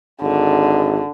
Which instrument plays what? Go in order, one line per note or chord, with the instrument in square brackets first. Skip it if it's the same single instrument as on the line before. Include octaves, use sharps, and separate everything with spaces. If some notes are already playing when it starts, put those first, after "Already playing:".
[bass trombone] G#1 [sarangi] D3